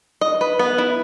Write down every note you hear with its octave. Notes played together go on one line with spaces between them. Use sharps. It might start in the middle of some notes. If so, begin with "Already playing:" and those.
D#5
B4
B3
E4